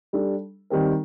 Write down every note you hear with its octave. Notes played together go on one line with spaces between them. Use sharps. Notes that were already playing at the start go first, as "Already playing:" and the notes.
G3 D4 A4
D#3 G3 C4 G4 A#4